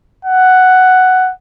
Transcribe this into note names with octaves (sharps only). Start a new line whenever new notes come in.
F#5